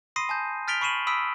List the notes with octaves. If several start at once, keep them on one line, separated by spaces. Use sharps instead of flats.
B5 C6 D#6 A#6 C7 D#7
G#5 A5 G6
F6 A6 B6 D7 F7 G7
B5 C#6 C7 D#7 E7 F#7
B5 D#6 E6 B6 D7